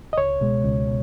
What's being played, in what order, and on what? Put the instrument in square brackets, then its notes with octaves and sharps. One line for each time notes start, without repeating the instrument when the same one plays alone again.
[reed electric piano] D#5
C#2 C#5
B2 G#3
C#2
B2